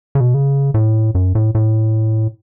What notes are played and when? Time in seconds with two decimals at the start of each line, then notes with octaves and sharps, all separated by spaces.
0.15 C#3
0.20 B2
0.34 C#3
0.74 A2
1.15 F#2
1.35 A2
1.55 A2